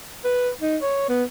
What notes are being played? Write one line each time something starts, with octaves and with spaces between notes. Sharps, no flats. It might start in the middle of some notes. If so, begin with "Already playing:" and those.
B4
D#4
C#5
B3